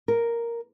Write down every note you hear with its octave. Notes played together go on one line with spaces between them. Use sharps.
A#4